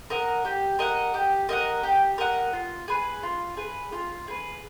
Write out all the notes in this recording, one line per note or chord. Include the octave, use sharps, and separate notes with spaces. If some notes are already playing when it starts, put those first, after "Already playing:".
A#4 D#5 F#5
G4
A#4 D#5 F#5
G4
A#4 D#5 F#5
G4
A#4 D#5 F#5
F4
G#4 B4
F4
G#4 B4
F4
G#4 B4